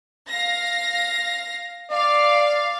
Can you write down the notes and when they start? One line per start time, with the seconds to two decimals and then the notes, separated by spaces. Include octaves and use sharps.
0.27 F5 A#6
1.92 D5 F5